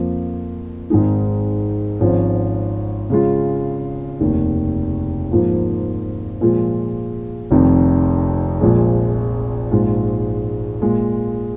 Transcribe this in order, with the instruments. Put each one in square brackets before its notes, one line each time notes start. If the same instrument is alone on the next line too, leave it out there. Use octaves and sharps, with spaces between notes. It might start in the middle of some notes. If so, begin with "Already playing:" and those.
Already playing: [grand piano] F2 F3 A#3
G#1 G#2 D#3 G#3 D#4
G#1 G#2 F3 C#4
C#3 G#3 F4
F1 D#2 D#3
G#2 F3 A#3 F4
A#2 F3 G#3 F4
F1 F2 D#3
A#1 A#2 F3 G#3
A#1 G#2 G#3 F4
A#2 G#3 F4